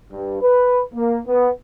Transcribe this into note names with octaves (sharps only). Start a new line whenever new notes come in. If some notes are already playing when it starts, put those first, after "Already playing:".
G2
B4
A#3
B3